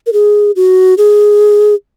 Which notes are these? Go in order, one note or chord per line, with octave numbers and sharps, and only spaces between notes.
A#4
G#4
F#4
G#4